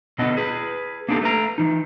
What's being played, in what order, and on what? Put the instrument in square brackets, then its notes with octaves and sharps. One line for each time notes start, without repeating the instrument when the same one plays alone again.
[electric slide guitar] B2 D3 F#3 B3 D#5
G#4 B4
A#3 B3 D4 E4 G4 A4
A3 B4 A#5
E3 D#4